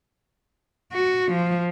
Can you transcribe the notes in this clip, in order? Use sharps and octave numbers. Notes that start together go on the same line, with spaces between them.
F#4
F3